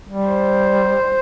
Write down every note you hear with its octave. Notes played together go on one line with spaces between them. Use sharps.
G3
C5